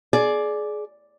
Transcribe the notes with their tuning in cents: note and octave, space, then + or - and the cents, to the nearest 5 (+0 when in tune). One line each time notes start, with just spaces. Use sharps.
G#4 +25 D5 +0